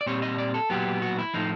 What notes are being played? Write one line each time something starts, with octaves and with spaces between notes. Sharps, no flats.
D5
A#2 G3 C4 C#5
D#5
D5
A4
A#2 F#3 B3 G4
F#4
E4
A2 F3 A3 D#4